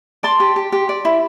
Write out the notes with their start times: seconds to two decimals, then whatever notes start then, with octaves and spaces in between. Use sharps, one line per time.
0.23 D5 A5 C6
0.40 G4
0.56 G4
0.72 G4
0.89 D5
1.05 E4